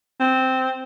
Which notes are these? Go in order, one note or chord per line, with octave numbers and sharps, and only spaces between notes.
C4